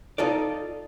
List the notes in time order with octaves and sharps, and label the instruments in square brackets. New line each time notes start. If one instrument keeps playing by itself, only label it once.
[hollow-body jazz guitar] D#4 F4 A4 D5